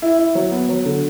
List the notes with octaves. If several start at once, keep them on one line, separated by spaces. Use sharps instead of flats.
E4
E4
F#3
B3
F#3
D3